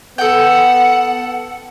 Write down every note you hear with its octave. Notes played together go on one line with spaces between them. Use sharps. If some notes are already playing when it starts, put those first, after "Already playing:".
B3 A4 F#5 G5